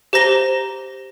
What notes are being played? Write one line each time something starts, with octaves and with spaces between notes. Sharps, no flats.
G4 C5 A#5 A#6 E7 G7